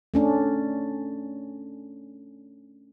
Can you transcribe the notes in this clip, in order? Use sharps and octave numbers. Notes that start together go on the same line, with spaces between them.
A3 C#4 D4